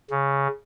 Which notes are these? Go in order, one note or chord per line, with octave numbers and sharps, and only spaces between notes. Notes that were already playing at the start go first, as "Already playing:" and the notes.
C#3